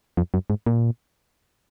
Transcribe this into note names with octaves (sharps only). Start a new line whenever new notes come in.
F2
F#2
G#2
A#2